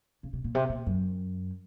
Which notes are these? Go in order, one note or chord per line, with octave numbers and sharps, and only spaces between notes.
C#3
C3
A#2
C3
A#2
F#2